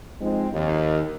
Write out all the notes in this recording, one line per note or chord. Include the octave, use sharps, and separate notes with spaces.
F3 G#3 C4 D#4
D#2